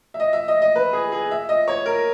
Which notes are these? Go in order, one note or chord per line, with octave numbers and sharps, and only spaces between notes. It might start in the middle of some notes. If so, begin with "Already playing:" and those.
E5
D#5
E5
D#5
D#5
B4
G#4
G#4
E5
D#5
C#5
A#4